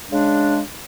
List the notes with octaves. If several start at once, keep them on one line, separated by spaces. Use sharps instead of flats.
C#3 G#3 D4